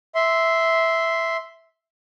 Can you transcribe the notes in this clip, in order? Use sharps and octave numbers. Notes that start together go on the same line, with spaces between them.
E5 C6